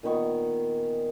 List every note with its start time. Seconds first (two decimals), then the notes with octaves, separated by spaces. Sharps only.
0.03 A#2 D#3 B3 C#6